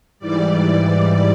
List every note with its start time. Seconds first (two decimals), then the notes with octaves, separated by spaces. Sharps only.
0.19 G#2 E3 G3 D5